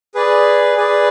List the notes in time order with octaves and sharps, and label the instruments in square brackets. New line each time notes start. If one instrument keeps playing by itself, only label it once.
[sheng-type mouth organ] G#4 B4 D5
G#4 B4 D5